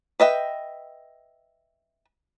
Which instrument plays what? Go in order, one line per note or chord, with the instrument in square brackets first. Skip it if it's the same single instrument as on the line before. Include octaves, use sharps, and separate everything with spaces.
[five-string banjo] B4 D#5 E5 G5